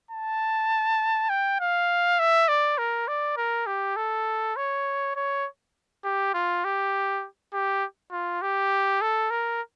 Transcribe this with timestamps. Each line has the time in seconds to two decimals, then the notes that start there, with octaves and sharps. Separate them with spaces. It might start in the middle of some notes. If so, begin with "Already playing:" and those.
0.11 A5
1.30 G5
1.60 F5
2.19 E5
2.48 D5
2.78 A#4
3.08 D5
3.37 A#4
3.67 G4
3.96 A4
4.57 C#5
5.16 C#5
6.05 G4
6.34 F4
6.65 G4
7.54 G4
8.12 F4
8.42 G4
9.02 A4
9.31 A#4